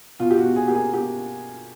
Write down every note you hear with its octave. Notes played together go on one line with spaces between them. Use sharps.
B2 F4
G4
F#4
B2
G#4
A#3 G4
G#4
B2 G4